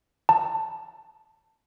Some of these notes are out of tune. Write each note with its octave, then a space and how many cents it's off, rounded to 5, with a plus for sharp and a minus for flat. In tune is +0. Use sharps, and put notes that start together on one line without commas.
A5 +10